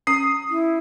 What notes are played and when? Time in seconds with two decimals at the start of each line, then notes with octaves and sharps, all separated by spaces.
0.07 C#4 D#6 C7
0.50 E4